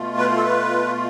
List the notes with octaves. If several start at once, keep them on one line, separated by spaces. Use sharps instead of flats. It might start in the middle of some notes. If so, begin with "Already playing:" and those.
Already playing: B2 A3 F4
B4
A4
B4